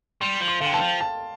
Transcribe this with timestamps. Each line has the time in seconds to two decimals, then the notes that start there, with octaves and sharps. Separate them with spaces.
0.21 G3 C6
0.40 F3
0.48 C6
0.61 D3 F5
0.66 G5
0.72 E3 A5
0.81 F3
1.01 A5